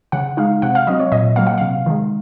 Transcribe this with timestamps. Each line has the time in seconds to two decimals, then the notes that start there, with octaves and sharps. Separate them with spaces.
0.12 C#3 F#5
0.37 G#3 D#4 F5
0.62 C3 F#5
0.75 F5
0.87 F#3 C4 D#5
1.00 C#5
1.12 A#2 D#5
1.36 F#3 A#3 F5
1.47 F#5
1.58 C3 F5
1.86 D#3 G#3